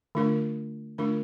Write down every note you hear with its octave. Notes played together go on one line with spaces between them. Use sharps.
D3 A3 D4 F4 A#4
D3 A3 D4 F4 A#4